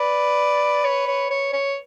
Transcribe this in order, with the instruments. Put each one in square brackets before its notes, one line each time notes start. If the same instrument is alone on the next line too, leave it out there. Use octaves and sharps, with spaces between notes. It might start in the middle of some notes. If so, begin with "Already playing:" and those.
Already playing: [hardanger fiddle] B4 [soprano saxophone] D5
[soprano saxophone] C#5
C#5
C#5
C#5